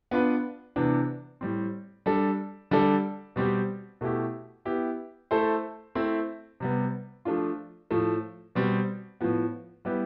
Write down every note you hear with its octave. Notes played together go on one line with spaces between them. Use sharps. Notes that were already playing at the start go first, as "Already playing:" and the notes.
B3 D4 F4 B4
C3 E3 B3 D4
A2 G3 C4
G3 D4 A4
D3 G3 D4 A4 D5
B2 G3 C4 G4
B2 A3 E4 G4
B3 E4 G4
A3 E4 A4 C5
A3 C4 E4
C3 G3 B3
F3 A3 D4 F4
A2 F3 A3
B2 G3 C4
A2 F3 B3
G3 B3 E4 G4 B4